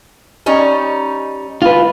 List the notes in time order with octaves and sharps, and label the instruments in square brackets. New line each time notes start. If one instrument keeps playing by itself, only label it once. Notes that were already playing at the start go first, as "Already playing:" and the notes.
[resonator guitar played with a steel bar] G3 C#4 D#4
[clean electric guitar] F4 B4